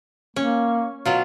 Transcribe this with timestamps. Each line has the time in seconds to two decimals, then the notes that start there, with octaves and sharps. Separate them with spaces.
0.36 A#3 C#4
1.05 B2 F#3 F4